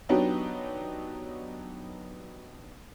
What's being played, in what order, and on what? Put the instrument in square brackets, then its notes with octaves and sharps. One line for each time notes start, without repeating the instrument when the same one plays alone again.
[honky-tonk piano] F#3 B3 D4 D#4 F#4 G4